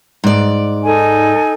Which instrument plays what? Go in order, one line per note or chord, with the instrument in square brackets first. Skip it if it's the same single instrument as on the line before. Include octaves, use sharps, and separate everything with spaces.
[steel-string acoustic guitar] G#2 D5
[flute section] D#4 A4 G#5